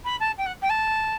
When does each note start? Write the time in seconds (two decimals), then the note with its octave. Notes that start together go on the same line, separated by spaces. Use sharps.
0.04 B5
0.20 A5
0.37 G5
0.46 F#5
0.62 G5
0.69 A5